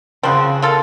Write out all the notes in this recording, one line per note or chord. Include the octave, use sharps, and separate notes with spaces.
C#3 F3 C4 F#4
A#3 F4 A4